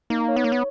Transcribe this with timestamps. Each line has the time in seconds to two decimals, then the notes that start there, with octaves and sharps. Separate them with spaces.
0.10 A#3 D#4
0.28 C#5
0.36 B3
0.44 A#3 C#5
0.52 B3